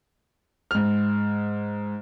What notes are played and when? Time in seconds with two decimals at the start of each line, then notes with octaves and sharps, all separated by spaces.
0.71 G#2 F6